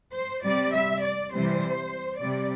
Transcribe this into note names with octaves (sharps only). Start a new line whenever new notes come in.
C5
C3 G3 D5
E5
D5
C3 E3 G3 C5
C3 G3 D5